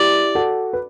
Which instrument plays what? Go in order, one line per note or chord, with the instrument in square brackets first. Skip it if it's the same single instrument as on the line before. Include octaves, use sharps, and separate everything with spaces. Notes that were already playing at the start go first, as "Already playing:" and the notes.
Already playing: [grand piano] E4 G4 [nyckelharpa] D5
[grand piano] F#4 A4
B4